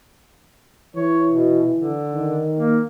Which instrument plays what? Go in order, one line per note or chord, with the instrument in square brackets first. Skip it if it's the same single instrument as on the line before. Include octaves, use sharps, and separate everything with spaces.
[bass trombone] E3 [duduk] C#5
[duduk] B2
D3
[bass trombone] D#3
[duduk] A#3